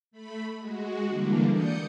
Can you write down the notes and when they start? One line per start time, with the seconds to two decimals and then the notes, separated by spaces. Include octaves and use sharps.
0.11 A3 B5
0.57 G#3 F#4
1.06 D3 E3 G3 A#3 D4
1.49 D5 D#6 G6 C#7